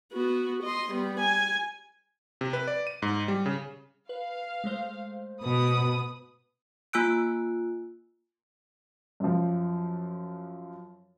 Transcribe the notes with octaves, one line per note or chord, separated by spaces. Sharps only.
B3 F#4
D#5 C6
G3 B3
G#5
C3
B4
D5
D#7
G#2
G3
C#3
B4 F5
G#3 A3 C5
B2 B4 D#6
A#3 F4 G#5 E6 F#6 D7
F#2 F3